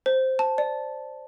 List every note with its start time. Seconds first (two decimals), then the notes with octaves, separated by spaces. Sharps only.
0.06 C5
0.39 A5
0.58 D5